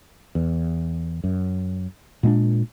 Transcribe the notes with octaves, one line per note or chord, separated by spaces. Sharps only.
E2
F#2
A#2 G#3 C4 D4